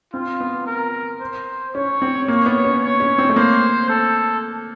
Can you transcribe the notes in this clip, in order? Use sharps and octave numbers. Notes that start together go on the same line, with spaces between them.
C4 F4
B3
A#4
C5
C#4 C#5
C4
A#3 C#5
B3
C#4
C#5
C#4
C4
A3
A#3 C5
A4